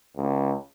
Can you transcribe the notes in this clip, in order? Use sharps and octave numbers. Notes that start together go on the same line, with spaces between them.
C#2